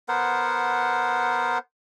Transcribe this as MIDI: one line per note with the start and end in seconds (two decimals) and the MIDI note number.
0.08 1.58 59
0.08 1.58 70
0.08 1.58 72
0.08 1.58 78